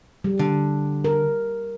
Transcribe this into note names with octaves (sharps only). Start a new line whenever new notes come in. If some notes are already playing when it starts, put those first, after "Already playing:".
G3
D3
A#4